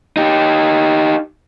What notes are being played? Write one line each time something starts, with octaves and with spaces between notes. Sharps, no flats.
D#4 G4